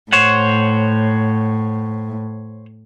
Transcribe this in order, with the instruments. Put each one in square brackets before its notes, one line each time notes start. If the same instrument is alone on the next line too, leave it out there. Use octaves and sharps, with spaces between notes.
[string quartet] A2 [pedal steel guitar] C5 C#5 F#5